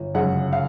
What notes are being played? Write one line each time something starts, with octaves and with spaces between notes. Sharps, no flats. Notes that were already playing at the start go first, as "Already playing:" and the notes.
Already playing: G1
F#2 C#3 F#5
F5